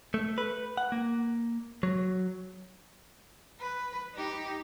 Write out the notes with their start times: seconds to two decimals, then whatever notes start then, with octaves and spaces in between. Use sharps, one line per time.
0.14 A3
0.38 B4
0.77 F#5
0.92 A#3
1.83 F#3
3.60 B4
4.14 D#4 G4